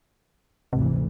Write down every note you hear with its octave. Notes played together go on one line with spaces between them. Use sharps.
G#1 D2 C3 E3